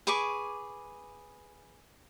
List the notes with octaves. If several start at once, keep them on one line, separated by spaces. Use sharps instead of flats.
G#4 B4 C#6 D6